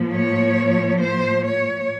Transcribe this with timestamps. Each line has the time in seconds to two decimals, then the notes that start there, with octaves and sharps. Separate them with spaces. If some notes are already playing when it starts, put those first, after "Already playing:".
Already playing: A2 F3 A#3
0.15 C#5
1.03 C5
1.46 C#5